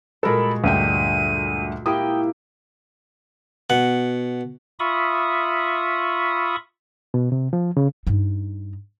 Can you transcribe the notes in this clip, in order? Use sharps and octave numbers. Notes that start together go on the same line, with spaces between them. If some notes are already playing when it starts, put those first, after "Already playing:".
A#2 G#3 F#4 A4 A#4 B5
D2 G2 G5 D#7
A#3 E4 G4 G5 D#6
B2 F#5
F4 E5 B5 C#6 D#6
B2
C3
F3
C#3
G2 D#4